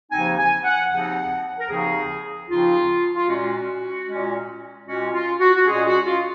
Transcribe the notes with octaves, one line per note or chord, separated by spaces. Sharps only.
D#2 C#3 F3 C4 D#4 G#5
G#5
F#5
D#2 C#3 F3 C4 D#4 F#5
A#4
D#2 C#3 F3 C4 D#4 G#4
D#2 C#3 F3 C4 D#4 F4
F4
A#2 G#3 C#4 F#4
A#2 G#3 C#4
A#2 G#3 C#4 F#4
F4
F#4
F#4
A#2 G#3 C#4 G#4
F#4
F4